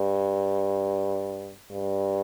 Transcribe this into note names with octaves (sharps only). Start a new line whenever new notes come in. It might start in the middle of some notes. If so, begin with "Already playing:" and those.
Already playing: G2
G2